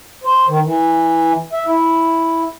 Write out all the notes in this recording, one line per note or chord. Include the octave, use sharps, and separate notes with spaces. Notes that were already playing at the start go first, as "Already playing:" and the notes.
C5
D#3
E3
E5
E4